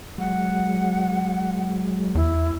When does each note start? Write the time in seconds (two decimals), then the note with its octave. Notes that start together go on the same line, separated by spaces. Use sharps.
0.18 F#3 G#3 F#5
2.15 E2 E4